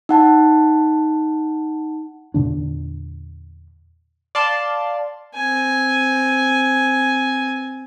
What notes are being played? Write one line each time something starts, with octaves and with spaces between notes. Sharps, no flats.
D#4 F#5 A5
E2 A#2 D3 D4
D5 F5 A5 C6
C4 G#5